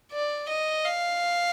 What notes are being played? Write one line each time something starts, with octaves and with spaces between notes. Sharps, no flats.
D5
D#5
F5